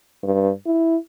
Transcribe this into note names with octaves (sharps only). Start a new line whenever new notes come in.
G2
E4